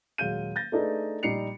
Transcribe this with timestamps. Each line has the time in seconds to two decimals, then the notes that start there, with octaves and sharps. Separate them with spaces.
0.18 D#1 F#3 G#3 F5 G6 D#7
0.56 G6 A6 A#6
0.72 A3 D4 D#4 G#4 A4 B4
1.23 A#1 G3 D#4 C7 C#7 F7